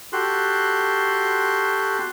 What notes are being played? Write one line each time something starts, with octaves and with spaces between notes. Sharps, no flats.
F#4 G4 A4 C6 F#6